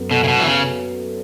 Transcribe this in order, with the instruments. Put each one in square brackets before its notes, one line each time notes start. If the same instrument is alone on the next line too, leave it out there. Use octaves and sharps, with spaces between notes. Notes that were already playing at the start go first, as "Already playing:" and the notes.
Already playing: [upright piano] F#2 F#3 B3 A4
[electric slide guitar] B2 [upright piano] A4
[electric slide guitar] C#3
B2
[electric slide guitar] E3 [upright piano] B3
[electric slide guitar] C#3